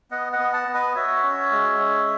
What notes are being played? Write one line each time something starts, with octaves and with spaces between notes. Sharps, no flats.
B3 D#5 F#5
D#5 F#5
B3
F#5 A5
B3
B4 D#5
F#4 C#5 E5
C#4
G#3
C#4